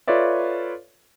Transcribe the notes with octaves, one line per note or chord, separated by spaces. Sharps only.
F4 A4 B4 C#5 D5 E5